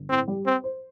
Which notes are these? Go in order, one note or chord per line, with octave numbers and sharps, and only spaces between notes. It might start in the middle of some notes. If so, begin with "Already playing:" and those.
Already playing: G1
A2 C4
G3
C4 C5
C5